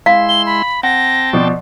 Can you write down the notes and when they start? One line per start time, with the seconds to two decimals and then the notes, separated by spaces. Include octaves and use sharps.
0.06 G#3 E4 F5 C6
0.29 G7
0.46 B5
0.83 C4 F#5 G5 A5 A#6
1.33 B2 F3 D5